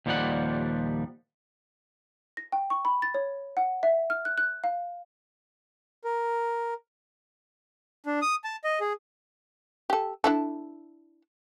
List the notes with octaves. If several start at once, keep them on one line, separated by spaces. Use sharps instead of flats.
D#2 A#2 F3 G3 D5 F#5
A#6
G5
C#6
B5
A6
C#5
F#5
E5
F6
F#6
F#6
F5
A#4
D4
D#6
A5
D#5
G#4
G4 A4
D4 E4 A4